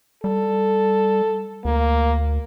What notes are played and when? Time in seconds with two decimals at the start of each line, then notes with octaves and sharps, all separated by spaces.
0.24 G3 A4
1.65 D2 A#3